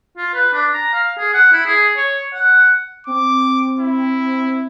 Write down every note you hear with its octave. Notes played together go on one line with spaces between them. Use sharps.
F4
B4
D4
A#5
F5
G#4
F#5
E4
G#4
C#5
F#5
C4 D6
E4